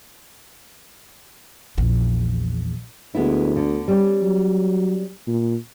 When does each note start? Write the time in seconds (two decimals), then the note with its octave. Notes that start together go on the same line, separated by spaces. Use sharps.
1.78 A#1 E2
3.15 D2 G#3 B3 E4
3.56 D3
3.88 G3 C#4
4.23 F#3
5.27 A#2